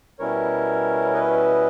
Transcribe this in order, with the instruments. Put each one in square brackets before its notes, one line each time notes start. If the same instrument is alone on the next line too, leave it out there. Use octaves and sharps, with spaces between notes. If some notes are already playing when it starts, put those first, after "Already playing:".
[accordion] B2 G3 C#4 E4 A#4 C#5
B4 D#5